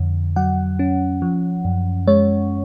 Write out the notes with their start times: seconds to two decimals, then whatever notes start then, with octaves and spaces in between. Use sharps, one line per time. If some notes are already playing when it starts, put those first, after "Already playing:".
Already playing: F2 D3
0.36 F#3 F#5
0.79 C#4
1.22 F3
1.65 F#2
2.07 G#3 C#5